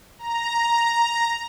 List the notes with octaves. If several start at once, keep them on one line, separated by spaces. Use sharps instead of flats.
A#5